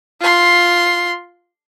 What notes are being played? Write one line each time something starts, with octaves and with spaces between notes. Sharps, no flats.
F4 C6